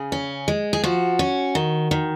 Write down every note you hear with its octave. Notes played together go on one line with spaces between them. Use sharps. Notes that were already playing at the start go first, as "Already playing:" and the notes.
Already playing: C#3 G#4
C#4
G#3
G#4
F3 F#4
C#4
D#3
D#3